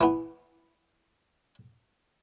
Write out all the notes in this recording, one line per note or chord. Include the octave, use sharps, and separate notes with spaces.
E3 B3